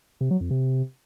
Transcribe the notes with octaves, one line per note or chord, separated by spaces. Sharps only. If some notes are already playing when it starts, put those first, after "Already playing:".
C3
F#3
F2
C3